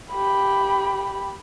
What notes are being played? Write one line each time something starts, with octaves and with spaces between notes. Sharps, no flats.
G4 B5